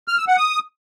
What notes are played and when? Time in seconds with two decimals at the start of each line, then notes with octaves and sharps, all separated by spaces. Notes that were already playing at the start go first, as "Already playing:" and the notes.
0.08 F6
0.18 E6
0.28 F#5
0.37 D#6